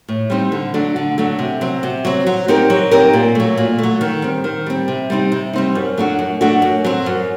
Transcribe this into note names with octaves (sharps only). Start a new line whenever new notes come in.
A2
G3 C4 D#4
D3
F#3 A3 D4
D3
F#3 A3 D4
C3
F#3 C4
C3
F#3 C4
F#3
C4 D#4 G4 A#4
F#3
C4 D#4 G4 A#4
A#2
F#3 A3
A#2
F#3 A3
D#3
G3 C4
D#3
G3 C4
C3
G3 C4 D#4
C3
G3 C4 D#4
F#2
F#3 A3 D4 F#4
F#2
F#3 A3 D4 F#4
F#2
F#3 C4
F#2